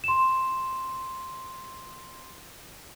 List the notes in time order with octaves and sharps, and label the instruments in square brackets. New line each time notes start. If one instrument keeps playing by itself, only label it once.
[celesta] C6 E7